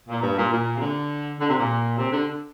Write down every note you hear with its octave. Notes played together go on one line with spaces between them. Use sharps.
A#2
G2
A#2
A#2
C3
D3
D3
C3
A#2
C3
D3